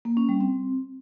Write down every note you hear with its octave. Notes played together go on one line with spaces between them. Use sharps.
A#3
C#4
G3
C4